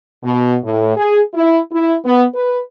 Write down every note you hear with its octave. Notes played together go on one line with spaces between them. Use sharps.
B2
A2
G#4
E4
E4
B3
B4